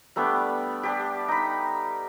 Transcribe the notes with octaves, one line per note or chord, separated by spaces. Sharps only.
G3 A3 B3 D4
D4 G4
D#4 B5